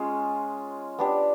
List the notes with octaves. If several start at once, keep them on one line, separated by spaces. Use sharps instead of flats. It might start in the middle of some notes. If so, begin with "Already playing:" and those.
Already playing: G#3 C#4 F4
B3 D4 G4